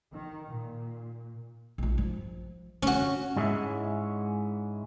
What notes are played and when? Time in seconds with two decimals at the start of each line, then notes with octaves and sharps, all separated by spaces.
0.13 D#3
0.46 A#2
1.78 A#1 F4
1.98 F3
2.82 F#2 D3 C#4 F#4
3.36 G#2 G3 G#3 C#4 E4 E5